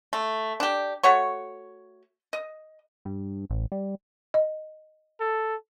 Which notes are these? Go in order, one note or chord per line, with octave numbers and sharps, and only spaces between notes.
A3
D4 G4
A3 F#4 C#5 C#6
D#5
G2
A1
G3
D#5
A4